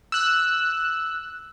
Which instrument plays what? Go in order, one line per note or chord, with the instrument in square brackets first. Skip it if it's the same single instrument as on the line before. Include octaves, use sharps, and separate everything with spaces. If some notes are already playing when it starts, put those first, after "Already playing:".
[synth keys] E6 F#6